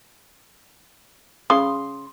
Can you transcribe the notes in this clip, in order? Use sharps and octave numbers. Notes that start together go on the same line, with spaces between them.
C#3 C6 D#6